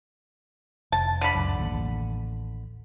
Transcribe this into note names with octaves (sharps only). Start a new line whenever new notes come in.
F1 A5
D3 B5
C#2 F#2
A1 D#2